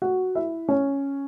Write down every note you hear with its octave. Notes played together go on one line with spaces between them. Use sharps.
F#4 F#5
E4 E5
C#4 C#5